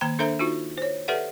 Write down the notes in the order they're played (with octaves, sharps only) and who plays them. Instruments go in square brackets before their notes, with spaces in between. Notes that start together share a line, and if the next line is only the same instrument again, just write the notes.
[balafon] D#3 A#3 G5 A#5
D4 A4 A#4 C5 E5 A#5
D#4 F4 F#4
C5 C#5
G4 A4 B4 D5 E5 F#5